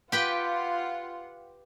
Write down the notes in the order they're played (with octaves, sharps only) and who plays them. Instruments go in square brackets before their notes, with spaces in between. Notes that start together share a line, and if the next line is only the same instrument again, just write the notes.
[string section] F4 F#5 [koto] G4 B4 G5